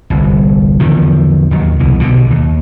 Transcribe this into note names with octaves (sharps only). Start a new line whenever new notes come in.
G1 C2
E2 D3 D#3 F3
D#2 D#3 F#3
C2 B2 E3
B1 B2 D3
D#2